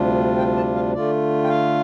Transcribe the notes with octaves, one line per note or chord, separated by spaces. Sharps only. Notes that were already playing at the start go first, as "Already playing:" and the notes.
Already playing: D2 C3 G3 D4 F4
G5
A5
F5
D3 A3 F4 D5
G5
F5